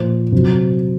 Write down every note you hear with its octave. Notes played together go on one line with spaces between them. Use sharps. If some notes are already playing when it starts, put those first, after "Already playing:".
Already playing: A#2 F3 C5
C3 F#3